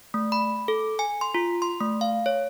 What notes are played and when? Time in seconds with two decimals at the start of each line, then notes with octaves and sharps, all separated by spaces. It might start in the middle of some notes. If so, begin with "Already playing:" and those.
0.14 A3
0.32 B5
0.68 A4
0.99 G#5
1.21 C6
1.34 F4
1.62 C6
1.81 A3
2.01 F5
2.26 C#5